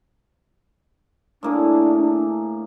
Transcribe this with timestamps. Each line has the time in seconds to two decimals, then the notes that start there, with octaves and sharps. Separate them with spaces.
1.43 A2 A#3 D4 G#4